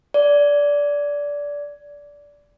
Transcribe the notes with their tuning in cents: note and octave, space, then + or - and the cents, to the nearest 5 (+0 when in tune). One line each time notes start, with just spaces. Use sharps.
D5 -15